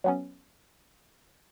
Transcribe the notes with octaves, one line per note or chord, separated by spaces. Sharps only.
F#3 B3 C#4